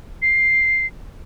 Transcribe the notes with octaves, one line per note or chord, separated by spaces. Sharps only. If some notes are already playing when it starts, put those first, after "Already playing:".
C7